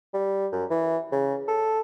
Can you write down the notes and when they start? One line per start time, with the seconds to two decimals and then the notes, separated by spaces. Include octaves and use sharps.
0.14 G3
0.53 F#2
0.70 E3
1.12 C#3
1.48 A4